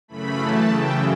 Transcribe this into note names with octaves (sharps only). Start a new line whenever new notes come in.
F#2 C#3 E3 A3 B5
A5
F#2 C#3 E3 G5